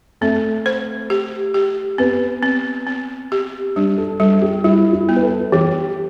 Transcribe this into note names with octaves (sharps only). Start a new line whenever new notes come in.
A3 C4
C5
G4
G4
B3 C4
C4
C4
G4
G3 D4
A4
G3 A4
G4
G3 E4
E4
B3
B4
A4
E3 G4